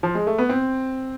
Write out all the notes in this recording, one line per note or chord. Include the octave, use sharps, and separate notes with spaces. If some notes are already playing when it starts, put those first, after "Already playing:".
F3
G#3
A3
B3
C4